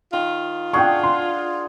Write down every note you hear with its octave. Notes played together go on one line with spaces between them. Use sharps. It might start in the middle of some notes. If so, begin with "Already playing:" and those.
D#3 F4
D4 G#4 F#5 G5 C#6
C6